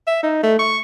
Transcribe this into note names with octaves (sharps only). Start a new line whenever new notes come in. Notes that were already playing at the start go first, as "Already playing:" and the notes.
E5
D#4
A3
C#6